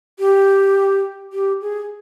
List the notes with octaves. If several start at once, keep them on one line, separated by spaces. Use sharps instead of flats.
G4
G4
G#4